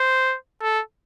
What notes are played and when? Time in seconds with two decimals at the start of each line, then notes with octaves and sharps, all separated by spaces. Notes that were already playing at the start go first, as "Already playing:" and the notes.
Already playing: C5
0.62 A4